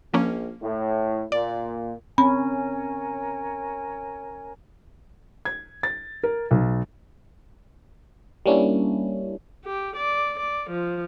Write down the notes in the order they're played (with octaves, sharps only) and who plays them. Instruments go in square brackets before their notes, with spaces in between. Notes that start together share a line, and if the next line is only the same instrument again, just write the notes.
[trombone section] A#1 [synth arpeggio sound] F3 A#3 C#4
[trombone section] A2
[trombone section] A#2 [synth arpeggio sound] D5
[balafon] C4 [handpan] C#4 [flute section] A#4 C#5 G#5 [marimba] B5
[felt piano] G#6
A6
A#4
B1
[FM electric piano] G3 A#3 C#4 D4 E4
[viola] G4
D5
D5
F3